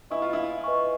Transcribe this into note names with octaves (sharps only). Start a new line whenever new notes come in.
E4 B4 D#5 G#5 C#6
F4
E4
B4 D#5 G#5 C#6